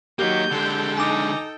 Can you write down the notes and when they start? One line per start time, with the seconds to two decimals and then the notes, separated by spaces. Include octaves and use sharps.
0.19 F#3 A#3 D#4 G4 G6
0.52 D3 G#3 A4 G5
0.98 D#4 G#5 A#5 D6